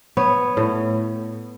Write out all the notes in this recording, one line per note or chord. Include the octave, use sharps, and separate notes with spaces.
B3 C#5
A2